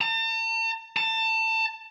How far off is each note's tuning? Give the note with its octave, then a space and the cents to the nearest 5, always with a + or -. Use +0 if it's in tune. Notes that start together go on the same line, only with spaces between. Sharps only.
A5 +45
A5 +25